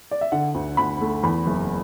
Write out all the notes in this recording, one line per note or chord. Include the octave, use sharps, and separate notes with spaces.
D5
E5
D3 F#5
D2
D2 B5
A3
E2 B5
F#1